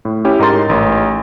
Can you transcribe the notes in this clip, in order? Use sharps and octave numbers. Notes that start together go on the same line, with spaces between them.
A2
C#4 E4 G4
G#2 D#4 A#4 C6 A6
A1